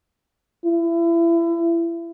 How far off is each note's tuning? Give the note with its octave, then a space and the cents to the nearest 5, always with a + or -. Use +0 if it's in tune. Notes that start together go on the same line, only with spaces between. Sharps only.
E4 +30